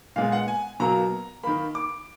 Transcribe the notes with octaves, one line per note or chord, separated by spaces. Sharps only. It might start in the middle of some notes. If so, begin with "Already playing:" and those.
A#2 G#3 B3 F5
F#5
G#5
B2 F#3 A#3 A#5
D#3 A#3 B5
D6